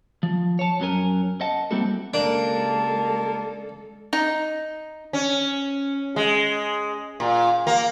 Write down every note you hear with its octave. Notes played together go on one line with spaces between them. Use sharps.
F3
C#5 A5
F#2 F#3 C#4 A#4 G#5
D#5 F#5 A5
G3 A#3 C4 E4 F#4 A4
C#3 G#3 A#3 D4 G4 A4 A5
D#4
C#4
G#3
A#2
A#3